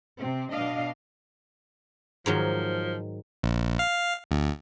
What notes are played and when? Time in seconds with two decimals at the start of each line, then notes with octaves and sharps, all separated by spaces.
0.18 C3 C4
0.51 B2 D4 D#5 F5
2.26 G#2 D#3 F3 F#3
3.43 A#1
3.79 F5
4.31 D2